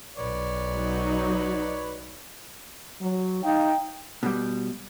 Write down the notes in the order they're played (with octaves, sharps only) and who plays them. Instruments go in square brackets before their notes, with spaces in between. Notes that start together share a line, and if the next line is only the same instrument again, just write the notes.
[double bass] B1 [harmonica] B4 C#5 D5
[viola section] F#3 D#4
[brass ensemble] F#3
[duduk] D#4 [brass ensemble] F5 G5
[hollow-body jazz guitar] B2 G3